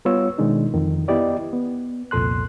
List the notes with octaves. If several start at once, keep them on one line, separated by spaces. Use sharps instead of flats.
G3 B3 F4 C#5 E6
B2 D#3 G#3 D4 D#4
F2 D#3 E3
B3 E4 G4 D5 D#5
B3
C2 F2 A#2 A4 C6 F#6